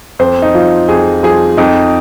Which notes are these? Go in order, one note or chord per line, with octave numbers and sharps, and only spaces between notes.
F2 C5
D#4
F3 F4
F2 G#4
F3 G#4
F2 D#4